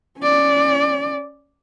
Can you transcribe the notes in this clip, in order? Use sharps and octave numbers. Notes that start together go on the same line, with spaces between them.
C#4 D5